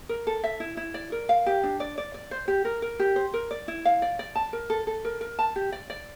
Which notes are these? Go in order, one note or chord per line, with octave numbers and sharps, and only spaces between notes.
A#4
A4
E5
E4
E4
D5
A#4
F5
G4
D4
D5
D5
D5
C5
G4
A#4
A#4
G4
C5
A#4
D5
E4
F5
D5
D5
A5
A#4
A4
A4
A#4
A#4
A5
G4
D5
D5